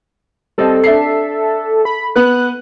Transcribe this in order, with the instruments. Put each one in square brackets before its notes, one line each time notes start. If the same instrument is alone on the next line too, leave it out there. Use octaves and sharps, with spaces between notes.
[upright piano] G3 C4 D#5 [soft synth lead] A4
[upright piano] D4 E5 C7
[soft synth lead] B5
[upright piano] B3 B4 [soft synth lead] F#6